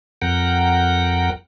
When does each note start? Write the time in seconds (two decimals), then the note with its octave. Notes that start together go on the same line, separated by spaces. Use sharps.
0.22 F2 A#4 F#5 G5